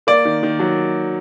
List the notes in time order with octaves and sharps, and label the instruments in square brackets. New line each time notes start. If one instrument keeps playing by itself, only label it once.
[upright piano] A#3 [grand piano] D5
[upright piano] D#3
D#3
F#3